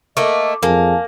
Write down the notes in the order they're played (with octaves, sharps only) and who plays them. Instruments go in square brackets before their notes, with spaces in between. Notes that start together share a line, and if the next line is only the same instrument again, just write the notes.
[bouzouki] A3 A#3 [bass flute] D#5 [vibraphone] D6
[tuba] F2 [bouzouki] A#3 [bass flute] G#4 [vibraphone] F5 G#5 A5